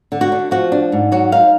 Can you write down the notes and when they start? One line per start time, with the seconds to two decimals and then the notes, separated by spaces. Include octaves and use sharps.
0.12 D3
0.21 F#4
0.32 D3
0.51 F3 F#4
0.72 D4
0.92 G#2
1.12 F#3 F#4
1.32 D#4 F5